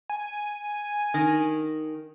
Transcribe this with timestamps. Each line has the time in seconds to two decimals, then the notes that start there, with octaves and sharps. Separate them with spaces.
0.09 G#5
1.14 D#3